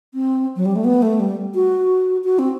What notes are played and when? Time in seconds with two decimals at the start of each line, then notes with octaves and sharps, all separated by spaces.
0.14 C4
0.56 F#3
0.66 G3
0.76 A3
0.84 B3
1.02 A3
1.20 G3
1.55 F#4
2.24 F#4
2.39 C4